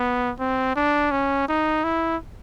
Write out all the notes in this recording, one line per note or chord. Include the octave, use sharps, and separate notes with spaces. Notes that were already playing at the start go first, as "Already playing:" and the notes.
Already playing: B3
C4
D4
C#4
D#4
E4